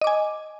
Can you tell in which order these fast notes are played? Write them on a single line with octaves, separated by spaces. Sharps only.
D#5 D6 G#5